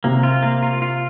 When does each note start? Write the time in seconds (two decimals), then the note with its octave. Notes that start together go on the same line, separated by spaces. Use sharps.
0.04 C3 A#3
0.23 F4
0.43 A#3
0.62 F4
0.82 F4